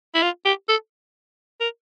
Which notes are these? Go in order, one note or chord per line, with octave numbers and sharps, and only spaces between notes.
E4
F4
G4
A4
A#4